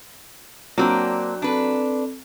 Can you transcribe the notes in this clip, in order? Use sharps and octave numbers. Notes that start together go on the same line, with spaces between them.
F#3 A#3 C4 D4
C4 D4 A4 B4